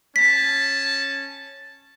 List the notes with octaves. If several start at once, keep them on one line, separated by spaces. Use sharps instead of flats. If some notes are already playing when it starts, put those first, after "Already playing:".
C#4 A5 B6